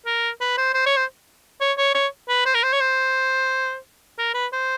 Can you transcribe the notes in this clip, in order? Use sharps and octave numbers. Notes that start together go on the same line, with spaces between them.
A#4
B4
C5
C5
C#5
C5
C#5
C#5
C#5
B4
C5
A#4
C5
C#5
C5
A#4
B4
C5